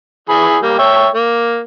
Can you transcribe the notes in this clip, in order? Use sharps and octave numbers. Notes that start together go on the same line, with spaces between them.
E3 G#4 B5
G3 A#3
C#5 E5 G5
A#3